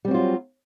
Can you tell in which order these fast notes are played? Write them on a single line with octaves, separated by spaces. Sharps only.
G3 C4 F#3 F4